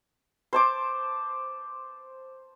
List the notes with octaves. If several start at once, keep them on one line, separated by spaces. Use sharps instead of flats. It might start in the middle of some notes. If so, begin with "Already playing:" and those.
C5 A5 D6